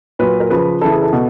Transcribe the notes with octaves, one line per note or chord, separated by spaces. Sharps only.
A#2 F#3 B4
A#4
C#3 F3 B4
C#3 E3 A4
G#4
A4
B2